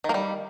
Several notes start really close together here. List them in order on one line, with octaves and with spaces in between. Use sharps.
D#3 A#3 G3